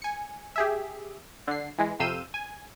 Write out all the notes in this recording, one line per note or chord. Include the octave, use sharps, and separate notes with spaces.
G#5 C#7
G4 G#4 E5
D3 C7
E3 G#3
F2 C3 F5 E6 G6 D#7
G#5